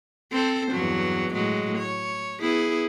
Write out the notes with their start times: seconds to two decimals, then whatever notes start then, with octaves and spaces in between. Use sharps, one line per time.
0.32 C4 A4 C5
0.72 E2 G2 F#3
1.33 A2 F#3 G#3
1.78 C#5
2.40 B3 E4 G#4